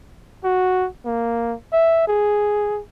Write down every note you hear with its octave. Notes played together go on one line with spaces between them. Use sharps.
F#4
A#3
E5
G#4